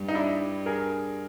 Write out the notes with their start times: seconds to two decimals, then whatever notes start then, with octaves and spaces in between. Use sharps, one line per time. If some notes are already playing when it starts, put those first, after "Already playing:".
Already playing: G2
0.08 D#4
0.15 D4 E4
0.66 G#4 A#4